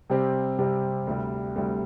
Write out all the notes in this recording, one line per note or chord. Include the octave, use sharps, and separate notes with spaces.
C3 G3 C4 G4
C3 G3 C4 G4
D2 C3 G3
D2 C3 G3